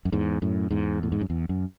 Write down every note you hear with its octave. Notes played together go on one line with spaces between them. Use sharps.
F#2
E2 G#2
F#2 A2
E2 G#2
A2
G#2
F#2
E2
F#2